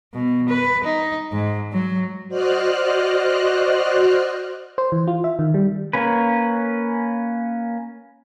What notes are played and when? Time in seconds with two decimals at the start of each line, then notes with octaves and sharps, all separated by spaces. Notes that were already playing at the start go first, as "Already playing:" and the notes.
0.14 B2
0.48 B4
0.84 D#4
1.32 G#2
1.72 F#3
2.28 F#4 C5 D5 D#5 F6 F#6
4.78 C5
4.92 E3
5.07 F4
5.24 E5
5.39 D#3
5.54 G3
5.93 A#3 C#4 B4